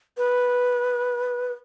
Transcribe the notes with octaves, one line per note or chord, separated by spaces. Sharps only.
B4